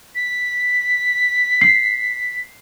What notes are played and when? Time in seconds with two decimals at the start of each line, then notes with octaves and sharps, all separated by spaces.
0.15 B6
1.61 C7